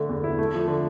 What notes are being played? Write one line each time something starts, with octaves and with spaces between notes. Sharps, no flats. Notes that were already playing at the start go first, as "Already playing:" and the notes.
Already playing: D3 A3
E2
E4
A3
F3
D3